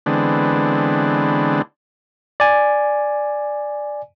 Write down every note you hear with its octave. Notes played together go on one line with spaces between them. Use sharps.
D3 E3 G#3 B3 C4 D4
D5 G#5